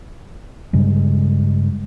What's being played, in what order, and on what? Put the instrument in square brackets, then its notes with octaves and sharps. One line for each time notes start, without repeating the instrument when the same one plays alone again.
[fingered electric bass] G2 C#3 G3 G#3